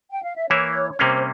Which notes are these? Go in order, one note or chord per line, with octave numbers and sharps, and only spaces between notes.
G5
F5
E5
E3 A#3 E4 C#5
C#5
C3 G3 A#3 C#4 C5